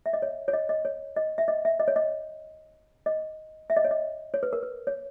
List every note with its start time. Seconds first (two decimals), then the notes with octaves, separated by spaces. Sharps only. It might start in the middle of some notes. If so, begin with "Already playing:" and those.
0.06 E5
0.13 D#5
0.22 C#5
0.48 C#5
0.53 D#5
0.69 D#5
0.85 C#5
1.16 D#5
1.38 E5
1.48 D#5
1.65 E5
1.80 D#5
1.88 C#5
1.96 D#5
3.06 D#5
3.70 E5
3.77 D#5
3.84 C#5
3.91 D#5
4.34 C#5
4.43 B4
4.53 A#4
4.63 B4
4.87 C#5